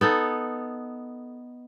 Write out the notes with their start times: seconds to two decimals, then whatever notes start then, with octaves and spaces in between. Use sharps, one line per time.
0.01 B3 D#4 A4